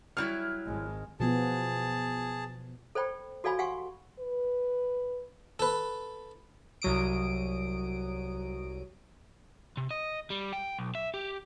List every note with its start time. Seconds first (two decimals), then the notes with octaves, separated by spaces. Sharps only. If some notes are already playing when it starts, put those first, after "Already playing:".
0.17 F#3 G3 E4 F6
0.66 G#1 G#3
1.20 B2 F3 B3 G#4 A5
2.95 A4 C5 D5 G5 B5
3.44 F#4 A4 D5 F5 G#5 B5
3.58 G4 F5 F#5 G#5 C6 C#6
4.20 B4
5.59 A4 B4
6.82 C2 F#3 D#6 D7
9.77 C3
9.91 D#5
10.30 G3
10.53 G5
10.79 B1
10.95 E5
11.14 G4